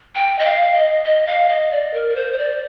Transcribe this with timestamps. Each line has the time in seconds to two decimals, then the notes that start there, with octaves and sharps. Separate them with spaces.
0.15 G5
0.39 D#5
0.45 F5
0.74 D#5
1.05 D#5
1.27 F5
1.49 D#5
1.72 D5
1.94 A#4
2.09 A#4
2.16 C5
2.33 C5
2.38 D5